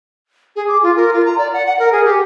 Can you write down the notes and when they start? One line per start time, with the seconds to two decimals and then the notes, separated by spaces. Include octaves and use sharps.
0.56 G#4
0.68 D6
0.83 F4
0.96 A#4
1.13 F4
1.25 A#5
1.38 D5
1.53 F#5
1.66 F#5
1.79 A#4
1.92 G#4
2.05 G4